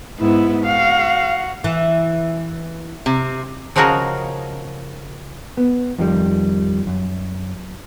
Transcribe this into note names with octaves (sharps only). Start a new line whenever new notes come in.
G#2 B3 E4
F#4 F5
E3
C3
C#3 F3 D#4 F#4 G#4 A#4
B3
F2 D#3 F3 G3
F#2